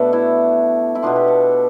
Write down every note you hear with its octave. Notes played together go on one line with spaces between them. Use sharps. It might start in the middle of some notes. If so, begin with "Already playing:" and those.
Already playing: B2 A3 D4 A4 B4 D5
E4
E4
B2 B3 D4 F4
G4
A4